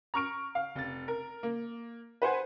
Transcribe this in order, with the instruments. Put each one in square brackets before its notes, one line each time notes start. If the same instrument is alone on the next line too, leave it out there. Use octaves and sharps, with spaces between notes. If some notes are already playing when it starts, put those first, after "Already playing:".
[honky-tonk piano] A#5 C#6 F6 D7
F5
F1 A6
A#4
A#3
B4 C5 F#5 G#5